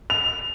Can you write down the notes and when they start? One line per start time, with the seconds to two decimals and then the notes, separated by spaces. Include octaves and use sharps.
0.10 F7